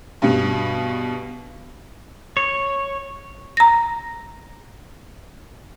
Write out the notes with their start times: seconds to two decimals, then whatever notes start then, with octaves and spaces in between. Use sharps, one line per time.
0.22 G2 B2
2.37 C#5
3.57 A#5 A#6